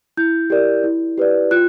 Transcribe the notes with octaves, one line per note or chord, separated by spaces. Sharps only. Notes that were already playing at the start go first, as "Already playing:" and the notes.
E4 G6
G4 A#4 D5
E4
G4 B4 D5
F4 F#6